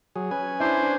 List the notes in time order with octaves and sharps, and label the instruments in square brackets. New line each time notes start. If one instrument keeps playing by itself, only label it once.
[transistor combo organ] F#3 G#4
C#4 B4 G#5
[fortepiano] D4 E4 [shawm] C5
[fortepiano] D4